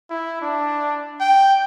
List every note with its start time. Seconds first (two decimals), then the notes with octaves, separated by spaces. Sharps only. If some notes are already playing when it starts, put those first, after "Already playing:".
0.10 E4
0.42 D4
1.20 G5